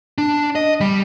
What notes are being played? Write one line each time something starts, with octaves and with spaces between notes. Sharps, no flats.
D4
D#5
G3